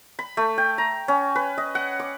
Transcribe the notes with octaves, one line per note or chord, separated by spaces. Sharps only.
B5
A3
G5
A#5
C#4
B4
D#5
F#5
D6